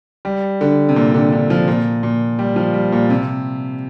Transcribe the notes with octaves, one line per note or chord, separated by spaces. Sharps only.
G3
D3
C3
A#2
D3
D3
F3
A#2
A#2
G3
F3
G3
A#2
C3